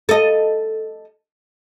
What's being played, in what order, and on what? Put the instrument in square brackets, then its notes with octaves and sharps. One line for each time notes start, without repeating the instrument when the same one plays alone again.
[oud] A4 D#5